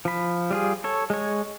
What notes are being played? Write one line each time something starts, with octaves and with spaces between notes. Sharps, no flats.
F3 B5
G3 F4 G#4
A4 C#5
G#3 C#5